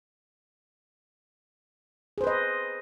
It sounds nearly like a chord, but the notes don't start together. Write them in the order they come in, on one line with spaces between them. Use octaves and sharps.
G#4 C5 B4 D#5